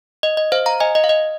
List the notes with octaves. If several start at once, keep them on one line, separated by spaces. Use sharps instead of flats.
D#5
D#5
C5 F5
F5 A#5
D#5 G#5
D#5
F5
D#5